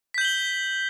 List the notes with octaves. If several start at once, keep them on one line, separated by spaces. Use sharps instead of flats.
G6 B6 F#7 G7